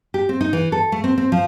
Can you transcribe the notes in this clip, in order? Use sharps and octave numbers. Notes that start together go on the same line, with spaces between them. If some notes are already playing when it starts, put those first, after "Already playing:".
G4
C4
D#4
E3
A4
A3
C4
C4
F3